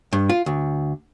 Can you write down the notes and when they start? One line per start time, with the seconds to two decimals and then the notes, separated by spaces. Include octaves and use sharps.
0.13 G2
0.29 F4
0.46 D2